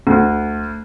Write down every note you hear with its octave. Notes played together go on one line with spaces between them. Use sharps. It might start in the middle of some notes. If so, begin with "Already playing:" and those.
D2